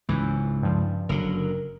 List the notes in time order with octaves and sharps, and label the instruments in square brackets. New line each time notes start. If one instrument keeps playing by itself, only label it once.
[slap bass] C#2 G#2 [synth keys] E3
[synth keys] G2 F3
[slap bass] F#1 D3 F#3 [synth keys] A#4